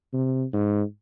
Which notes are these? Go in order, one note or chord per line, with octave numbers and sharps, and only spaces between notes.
C3
G#2